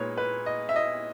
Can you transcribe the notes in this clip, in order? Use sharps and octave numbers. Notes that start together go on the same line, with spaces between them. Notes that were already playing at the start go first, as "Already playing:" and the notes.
Already playing: A#2 G#3 D#4 B4 C#5
B4
D#5
E5
D#5